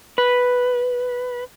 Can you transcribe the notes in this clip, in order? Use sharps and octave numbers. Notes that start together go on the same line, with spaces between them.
B4